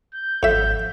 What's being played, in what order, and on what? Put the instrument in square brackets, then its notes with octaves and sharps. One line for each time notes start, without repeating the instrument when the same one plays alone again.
[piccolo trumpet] G6
[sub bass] G#1 [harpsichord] F2 E5 [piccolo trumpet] G6